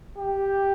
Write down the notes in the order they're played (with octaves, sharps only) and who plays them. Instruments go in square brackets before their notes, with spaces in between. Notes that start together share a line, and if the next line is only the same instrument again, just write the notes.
[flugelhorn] G4